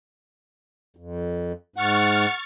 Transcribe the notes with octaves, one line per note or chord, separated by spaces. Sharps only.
F2
G#2 F#5 C#6 F6 A6